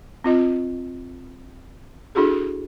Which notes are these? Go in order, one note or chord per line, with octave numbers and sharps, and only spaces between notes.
C4 F4 D#5
D4 E4 F#4 G#4 A4